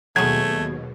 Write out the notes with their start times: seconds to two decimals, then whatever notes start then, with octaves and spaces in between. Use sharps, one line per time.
0.16 D#2 B2 F#3 G#3 A3 G#6